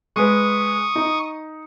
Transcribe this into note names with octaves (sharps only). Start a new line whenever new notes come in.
G#3 B4 C#6 D#6
D#4